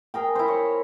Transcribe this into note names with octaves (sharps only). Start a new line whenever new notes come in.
G#4 A#4 G5
E4 C5
C#5